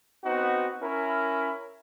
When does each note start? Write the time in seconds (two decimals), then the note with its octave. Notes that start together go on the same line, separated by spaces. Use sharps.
0.24 B3 C4 D#4 F#4
0.82 C#4 E4 A#4